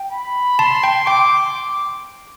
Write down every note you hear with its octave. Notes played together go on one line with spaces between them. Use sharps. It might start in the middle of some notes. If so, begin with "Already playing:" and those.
Already playing: G5
B5
A5 C6
G5
G5 D6